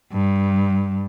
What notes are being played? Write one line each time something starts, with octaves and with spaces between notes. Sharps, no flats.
G2